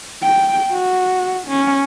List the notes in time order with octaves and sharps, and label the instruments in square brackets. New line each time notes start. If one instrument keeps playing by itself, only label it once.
[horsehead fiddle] G5
F#4
C#4